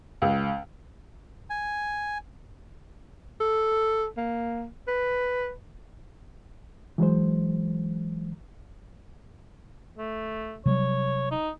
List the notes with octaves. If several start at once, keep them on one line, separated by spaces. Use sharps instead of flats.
C#2
G#5
A4
A#3
B4
E3 F#3 G#3 C5
A3
C3 F#3 G3 C#5
D#4